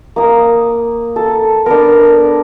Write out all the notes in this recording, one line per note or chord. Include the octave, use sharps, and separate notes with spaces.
A#3 D#6
A4
B3 D4 A#4